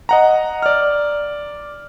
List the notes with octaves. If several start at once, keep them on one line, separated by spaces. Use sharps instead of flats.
D#5 F#5 A#5
D5 F6